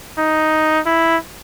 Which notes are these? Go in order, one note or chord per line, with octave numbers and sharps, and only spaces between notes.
D#4
E4